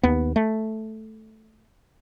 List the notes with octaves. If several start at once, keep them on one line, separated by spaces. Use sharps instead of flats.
D#2 B3
A3